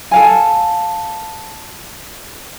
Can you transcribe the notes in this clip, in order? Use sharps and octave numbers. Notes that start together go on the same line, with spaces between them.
A4 F5 G#5